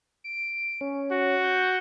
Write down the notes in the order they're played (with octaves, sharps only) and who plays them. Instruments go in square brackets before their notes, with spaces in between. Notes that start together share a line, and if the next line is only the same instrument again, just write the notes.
[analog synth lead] D7
C#4
[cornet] F#4
[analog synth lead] G6